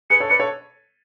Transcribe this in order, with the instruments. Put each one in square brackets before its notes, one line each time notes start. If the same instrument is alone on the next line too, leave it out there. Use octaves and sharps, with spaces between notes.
[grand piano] G#4 B4 [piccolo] C#7
[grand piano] A4 C#5
[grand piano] B4 D5 [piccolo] C#7
[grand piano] A4 C#5